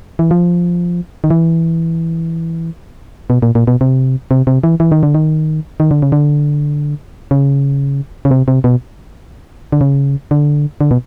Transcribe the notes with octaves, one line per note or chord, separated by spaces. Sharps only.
E3
F3
D#3
E3
B2
A#2
A#2
B2
C3
C3
C3
E3
E3
D#3
D3
D#3
D#3
D3
C#3
D3
C#3
C#3
C3
C3
B2
D3
C#3
D3
D3
B2